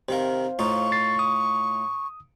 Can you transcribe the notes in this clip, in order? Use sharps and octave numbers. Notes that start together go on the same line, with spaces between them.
C3 D#3 A#4 C5 F5
A2 D#4 F4 C#6
A6 C7
D#6